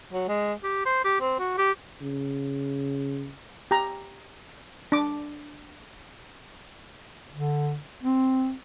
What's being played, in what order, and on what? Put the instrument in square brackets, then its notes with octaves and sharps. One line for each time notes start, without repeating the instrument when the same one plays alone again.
[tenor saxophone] F#3
G#3
G4
C5
G4
C4
F#4
G4
[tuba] C#3
[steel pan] G4 A#5
D4 D6
[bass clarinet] D3
C4